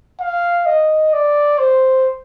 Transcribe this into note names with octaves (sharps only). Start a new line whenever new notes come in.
F5
D#5
D5
C5